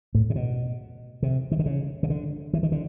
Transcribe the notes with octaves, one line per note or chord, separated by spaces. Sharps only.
A2
C3
B2
C3
D#3
D3
C#3
C#3
D3
E3
D#3
D3